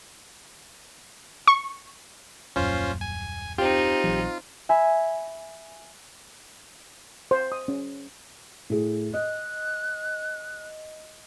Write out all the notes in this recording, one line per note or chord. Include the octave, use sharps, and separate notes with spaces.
C#6
D#1 F#2 A#2 C#4 F4 C5
G#5
C4 D#4 F4 G4
A#1 E3 F#3
E5 G#5 B5
C5
D#6
C#4
A2 G#4
D#5 F#6